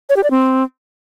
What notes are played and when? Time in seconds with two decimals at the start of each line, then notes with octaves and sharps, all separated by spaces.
0.10 C#5
0.17 G4
0.24 D5
0.31 C4